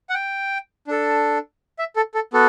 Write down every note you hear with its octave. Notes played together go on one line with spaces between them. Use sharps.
F#5
G5
D4 A4
E5
A4
A4
B3 F#4 A4